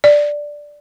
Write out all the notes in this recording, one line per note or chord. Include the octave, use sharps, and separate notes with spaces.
D5